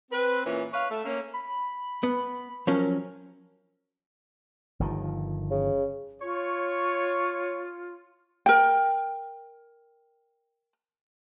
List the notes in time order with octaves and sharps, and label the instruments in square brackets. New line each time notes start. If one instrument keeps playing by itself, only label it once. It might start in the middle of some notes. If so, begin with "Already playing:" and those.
[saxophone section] C4 B4
A#2 E3 C#4
B4 C#5 F5
A3 E5
A#3 C#4
[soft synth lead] B5
[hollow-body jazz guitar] B3
[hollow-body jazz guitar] F3 F#3 C#4 [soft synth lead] A#4
[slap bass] G1 D#3 F3
[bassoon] C#3
[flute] F4 [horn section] C#5
[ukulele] A#4 G5